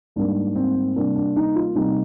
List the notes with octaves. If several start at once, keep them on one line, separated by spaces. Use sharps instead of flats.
G#2 G3 A#3 D4
C4
C3 G3 A#3 D4
D4
D#4
F4
C3 G3 A#3 D#4